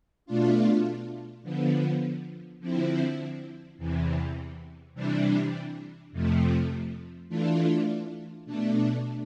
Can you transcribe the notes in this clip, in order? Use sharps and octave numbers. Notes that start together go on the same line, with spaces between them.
B2 A3 D4 F4
D3 F3 B3
D3 F3 C4 E4
E2 C3 E3
C3 E3 G3 D4
F2 C3 F3 A3
E3 A3 D4 F4
B2 A3 D4